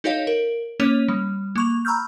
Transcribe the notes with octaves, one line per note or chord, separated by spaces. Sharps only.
D#4 F#4 A4 C#5 D#5 F5
A#4
A#3 C#4 C#5 D#7 F7
G3
A#3 C#6 F7
A#5 B5 C#6 E6 F6 G6